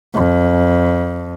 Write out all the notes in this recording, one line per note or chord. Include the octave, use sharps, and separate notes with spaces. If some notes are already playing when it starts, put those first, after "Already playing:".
F2